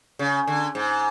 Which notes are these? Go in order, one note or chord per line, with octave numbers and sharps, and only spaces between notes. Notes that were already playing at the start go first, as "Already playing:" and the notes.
C#3
D3
G#2